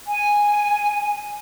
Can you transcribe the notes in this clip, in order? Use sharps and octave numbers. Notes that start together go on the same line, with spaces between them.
G#5